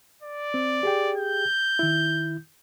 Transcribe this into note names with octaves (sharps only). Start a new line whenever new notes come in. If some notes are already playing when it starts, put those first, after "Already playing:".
D5
C4
G4 G#4 G5
G6
D#3 E4